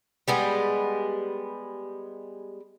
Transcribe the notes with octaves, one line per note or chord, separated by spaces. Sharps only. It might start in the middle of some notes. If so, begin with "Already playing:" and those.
G3 G#3 B3